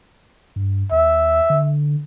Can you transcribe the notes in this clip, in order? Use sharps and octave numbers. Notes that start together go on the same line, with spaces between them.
G2
D#2 E5
D3